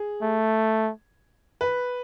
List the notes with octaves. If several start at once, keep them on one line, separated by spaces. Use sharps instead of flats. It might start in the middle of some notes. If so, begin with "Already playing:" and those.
Already playing: G#4
A3
B4